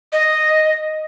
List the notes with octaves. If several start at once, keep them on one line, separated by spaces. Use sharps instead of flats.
D#5